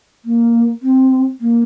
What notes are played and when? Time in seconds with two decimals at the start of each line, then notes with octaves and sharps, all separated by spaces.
0.25 A#3
0.82 C4
1.41 A#3